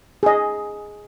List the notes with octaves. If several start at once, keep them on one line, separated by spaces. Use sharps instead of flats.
G#4 D#5